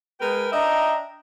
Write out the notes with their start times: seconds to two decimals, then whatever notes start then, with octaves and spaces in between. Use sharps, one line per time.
0.20 G#3 A#4 B4 G5
0.52 D4 D#5 E5 G5 A#5